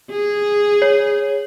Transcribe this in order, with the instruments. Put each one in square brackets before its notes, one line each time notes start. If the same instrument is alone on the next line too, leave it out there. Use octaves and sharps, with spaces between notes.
[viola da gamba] G#4
[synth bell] C#5